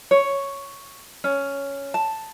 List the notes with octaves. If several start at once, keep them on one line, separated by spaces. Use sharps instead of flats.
C#5
C#4
A5